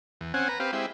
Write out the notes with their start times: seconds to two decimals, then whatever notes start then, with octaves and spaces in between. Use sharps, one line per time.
0.21 E2
0.34 C4 C#4 F#5 G#5
0.49 B4 A#5
0.60 C4 G4 B4 F5
0.73 G#3 C4 E4 G4